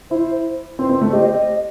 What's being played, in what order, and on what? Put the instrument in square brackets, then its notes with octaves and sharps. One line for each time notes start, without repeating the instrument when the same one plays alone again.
[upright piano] E4 [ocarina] C5
[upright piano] C4 [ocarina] C5
[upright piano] C4
A3
[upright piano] G4 [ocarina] D#5
[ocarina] C5
D#5